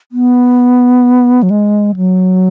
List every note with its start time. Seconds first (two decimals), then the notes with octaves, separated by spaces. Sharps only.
0.12 B3
1.43 F#3
1.50 G#3
1.96 F#3